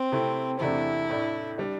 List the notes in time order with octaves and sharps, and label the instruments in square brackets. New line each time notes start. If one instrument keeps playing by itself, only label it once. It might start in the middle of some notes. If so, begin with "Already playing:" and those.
Already playing: [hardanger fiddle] C4
[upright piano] C3 A3 E4
[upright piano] E2 C3 A3 D4 [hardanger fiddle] E4
[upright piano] A2 A3 D4
G3 D4